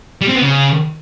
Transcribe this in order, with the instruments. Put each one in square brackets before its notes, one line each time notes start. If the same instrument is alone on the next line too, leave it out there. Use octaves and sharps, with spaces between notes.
[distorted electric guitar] G3
C4
B3
C#3